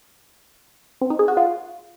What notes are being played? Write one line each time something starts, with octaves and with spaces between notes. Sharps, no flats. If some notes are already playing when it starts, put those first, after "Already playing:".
C4
D#4
G#4
F#4
F4